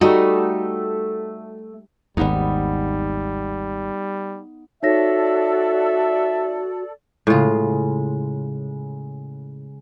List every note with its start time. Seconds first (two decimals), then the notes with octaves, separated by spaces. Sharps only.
0.01 G3 A3 D#4 F#4 A4 D#5
2.17 G#1 D#2 G3 B3 D#4
4.83 D#4 F#4 A4 C#5 D5 E5 A#6
7.27 A2 C#3 G#3 F4